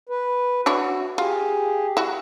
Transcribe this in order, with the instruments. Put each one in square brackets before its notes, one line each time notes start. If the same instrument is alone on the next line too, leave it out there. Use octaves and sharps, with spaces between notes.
[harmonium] B4
[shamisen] D4 E4 C#5 [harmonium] F#4
[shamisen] F4 [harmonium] G4 G#4
[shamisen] E4 F#4